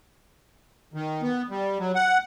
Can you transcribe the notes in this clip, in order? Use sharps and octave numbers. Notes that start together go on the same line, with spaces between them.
D#3
B3
G3
F#3
F#5